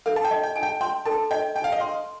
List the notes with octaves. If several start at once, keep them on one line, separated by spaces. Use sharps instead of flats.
A4 F5
A5
G5
D#5
G5
A5
G5
G5 C6
A4 A5
D#5 G5
G5 A5
F5
D#5
F5 C6